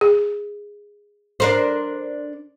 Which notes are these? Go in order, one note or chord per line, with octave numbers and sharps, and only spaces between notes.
G#4
D4 A#4 C5